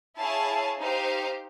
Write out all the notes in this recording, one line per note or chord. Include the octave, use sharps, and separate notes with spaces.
E4 G#4 C#5 F5 A5
D#4 G4 C5 F5